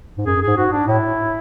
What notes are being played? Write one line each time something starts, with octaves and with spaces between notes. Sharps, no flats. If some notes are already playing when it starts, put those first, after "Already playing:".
G#2
F#2 G#4
F#2
G#2 G#4
G#2 F#4
D4
A2 E4